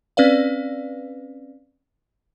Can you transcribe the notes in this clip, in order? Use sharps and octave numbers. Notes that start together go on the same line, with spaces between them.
C4 C#4 B4 D5 F5